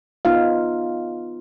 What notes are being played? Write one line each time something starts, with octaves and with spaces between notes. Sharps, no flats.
B3 D#4 F4 F5